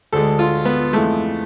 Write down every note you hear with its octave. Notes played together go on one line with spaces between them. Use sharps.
D2 D3 G#3 A4
F4
B3
F2 E3 G#3 A3